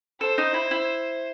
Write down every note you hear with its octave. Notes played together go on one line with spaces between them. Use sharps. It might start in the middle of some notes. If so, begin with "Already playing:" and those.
A4 C5
D#4
E4
E4